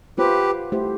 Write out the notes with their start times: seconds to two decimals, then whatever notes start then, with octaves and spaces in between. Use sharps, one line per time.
0.18 B3 F4 G4 B4 C5
0.72 A3 E4 G4 C5